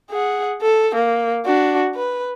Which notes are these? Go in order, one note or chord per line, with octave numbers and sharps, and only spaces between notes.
G#4 F#5
A4
A#3
D4 F#4
B4